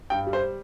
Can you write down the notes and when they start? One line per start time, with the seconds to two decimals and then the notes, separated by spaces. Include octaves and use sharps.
0.10 G2 G5
0.27 G3
0.33 C5